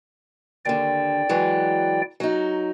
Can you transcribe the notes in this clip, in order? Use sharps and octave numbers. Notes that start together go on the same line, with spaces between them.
D#2 D3 D5 G5
E3 F#3 G#3
F#3 D#4